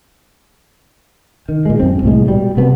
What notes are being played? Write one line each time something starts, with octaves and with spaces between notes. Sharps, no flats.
D#3
A#2 G#3
F#2 C4
C2 A2 G#3
B2 G3
C3 F#3 B3